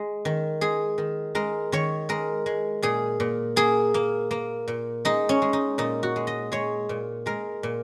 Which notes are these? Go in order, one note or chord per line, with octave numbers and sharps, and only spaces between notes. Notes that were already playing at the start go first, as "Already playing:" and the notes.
Already playing: G#3
D#3
G#3 G#4
D#3
G#3 A#4
D#3 C#5
G#3 A#4
G#3
A#2 G#4
A#2
A#3 G#4
A#3
A#3
A#2
G#3 D#4
C#4
G#3
D#4
A#2 D#4
F#4
G#3
D#5
G#3 C#5
A#2
G#3 A#4
A#2